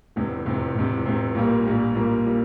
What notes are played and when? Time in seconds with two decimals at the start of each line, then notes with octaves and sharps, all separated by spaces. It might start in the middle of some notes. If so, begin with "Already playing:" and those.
0.16 F1 E2 C3
0.46 F1 E2 C3
0.75 F1 E2 C3
1.06 F1 E2 C3
1.35 A#1 A#2 G3 A#3
1.65 A#1 A#2 G3 A#3
1.95 A#1 A#2 G3 A#3
2.25 A#2 G3 A#3